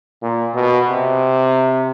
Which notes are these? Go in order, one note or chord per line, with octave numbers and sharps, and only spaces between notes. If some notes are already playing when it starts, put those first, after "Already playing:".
A#2
B2
C3